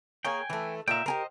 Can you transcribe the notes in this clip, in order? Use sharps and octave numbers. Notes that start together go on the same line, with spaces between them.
A#3 G#4 C#5 G5 G#5
E3 A3
A#2 D#4 E5 G5 A#5
G4 G#4 A#4 C5 D#5